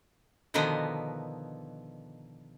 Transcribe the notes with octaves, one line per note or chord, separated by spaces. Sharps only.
B2 D3 D#3 F3 B3 D#5